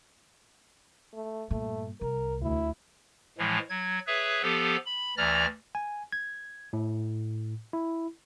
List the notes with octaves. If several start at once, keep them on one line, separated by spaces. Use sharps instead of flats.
A3
G2 A#2 A3
C2 A#4
D2 E4
A2 E3 F3 G#3
F#3 G#6
G#4 B4 C#5 E5
F3 B3 G4 A4
B5
D2 E3 D5 A#5 F6 A#6
G#5
G#6
A2
E4